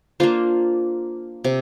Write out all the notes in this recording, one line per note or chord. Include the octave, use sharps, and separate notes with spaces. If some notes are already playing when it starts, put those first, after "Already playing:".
A#3 D4 F4 C5
C3